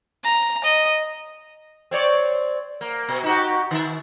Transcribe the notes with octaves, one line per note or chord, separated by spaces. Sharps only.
A#5
D#5
C4 C#5 D5
A#3
B2
D#4 F#4 G4
D#3